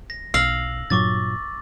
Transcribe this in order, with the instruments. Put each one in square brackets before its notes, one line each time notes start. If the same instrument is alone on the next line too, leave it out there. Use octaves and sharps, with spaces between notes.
[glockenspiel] A#6
[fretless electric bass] B1 [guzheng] F5 [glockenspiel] E6 A#6 F#7
[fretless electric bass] G2 A#2 F#3 [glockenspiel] C#6 D6 A6